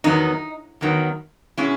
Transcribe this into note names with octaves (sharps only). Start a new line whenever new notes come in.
E2 D#3 F#3 B3 D#4
E2 D#3 F#3 B3
B2 G#3 C#4 E4